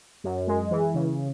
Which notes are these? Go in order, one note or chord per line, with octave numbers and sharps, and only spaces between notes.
F#2
G#3
E3
C#3